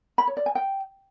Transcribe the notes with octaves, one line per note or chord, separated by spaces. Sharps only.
B5
C#5
D5
G#5
G5